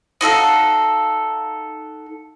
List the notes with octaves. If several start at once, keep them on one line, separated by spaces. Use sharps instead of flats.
D#4 F#4 A4 F5